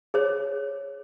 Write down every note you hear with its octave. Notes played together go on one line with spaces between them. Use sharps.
G#4 C5 C#5